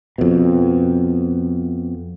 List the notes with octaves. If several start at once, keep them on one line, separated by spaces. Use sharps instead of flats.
F2 B2